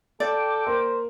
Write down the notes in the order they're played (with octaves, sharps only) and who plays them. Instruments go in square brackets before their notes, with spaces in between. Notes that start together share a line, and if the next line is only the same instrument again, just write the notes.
[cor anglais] A4 [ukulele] D5 [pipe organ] G5 D6
[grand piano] A#3 [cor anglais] C5